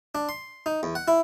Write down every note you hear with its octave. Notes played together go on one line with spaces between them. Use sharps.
D4
C6
D#4
E2
F#5
E4